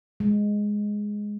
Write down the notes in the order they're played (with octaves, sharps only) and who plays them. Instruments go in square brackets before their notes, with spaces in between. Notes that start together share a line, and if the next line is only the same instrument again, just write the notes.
[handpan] G#3